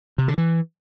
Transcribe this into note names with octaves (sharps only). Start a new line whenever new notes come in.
C3
D3
E3